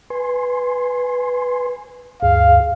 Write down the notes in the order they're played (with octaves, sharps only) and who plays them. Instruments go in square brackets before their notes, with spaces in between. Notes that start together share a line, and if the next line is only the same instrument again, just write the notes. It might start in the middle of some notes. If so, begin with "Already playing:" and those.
[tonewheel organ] B4 G#5 C6
[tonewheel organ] D2 G2 G#4 [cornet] F5